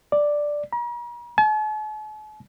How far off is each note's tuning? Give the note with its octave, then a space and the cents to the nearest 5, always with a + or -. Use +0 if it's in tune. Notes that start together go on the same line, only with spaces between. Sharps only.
D5 +0
A#5 +45
A5 -45